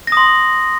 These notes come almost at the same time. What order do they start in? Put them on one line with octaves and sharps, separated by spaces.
A#6 D#6 C6